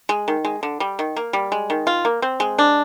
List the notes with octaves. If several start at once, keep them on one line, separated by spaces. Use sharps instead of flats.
G#3
D#3
G#3
D3
G3
D#3
A#3
G3
G#3
D#3
F4
A#3
C4
G#3
D4